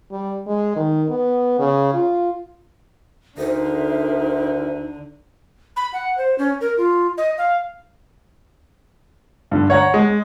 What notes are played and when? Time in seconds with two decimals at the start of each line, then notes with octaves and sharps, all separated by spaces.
0.12 G3
0.47 G#3
0.76 D#3
1.09 B3
1.59 C#3
1.94 F4
3.38 D2 D3 D#4 A#4 C5 E5
5.76 B5
5.93 F#5
6.18 C5
6.38 C#4
6.61 A#4
6.77 F4
7.18 D#5
7.38 F5
9.51 G2 D3
9.70 C#5 F#5 A#5
9.94 G#3